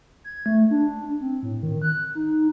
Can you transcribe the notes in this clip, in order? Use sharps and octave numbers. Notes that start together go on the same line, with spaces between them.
G#6
A3
D4
C4
A2
D#3
F#6
D#4